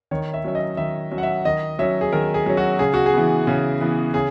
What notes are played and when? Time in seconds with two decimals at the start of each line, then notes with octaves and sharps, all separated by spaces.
0.11 D#3 C#5
0.34 E5
0.44 F#3 C#4 E5
0.55 D#5
0.77 D#3 E5
1.11 F#3 C#4
1.18 F#5
1.23 E5
1.45 D#3 D#5
1.79 F#3 C#4 E5
2.01 G#4
2.12 D#3 A#4
2.34 G#4
2.46 F#3 C#4
2.57 F#4
2.79 C#3 G#4
2.94 F#4
3.06 G#4
3.14 E3 B3
3.47 C#3
3.81 E3 B3
4.14 C#3 G#4